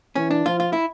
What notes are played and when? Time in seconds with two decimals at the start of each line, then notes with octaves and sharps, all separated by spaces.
0.15 E3 C#4
0.31 D4
0.46 F3 F4
0.60 F4
0.73 E4